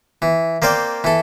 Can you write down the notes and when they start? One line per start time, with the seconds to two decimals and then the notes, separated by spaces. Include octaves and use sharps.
0.22 E3
0.62 A#3 C4 D5 F5 G5
1.04 E3 A4